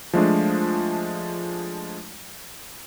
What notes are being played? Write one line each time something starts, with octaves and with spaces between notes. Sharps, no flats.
F3 G#3 A3 D4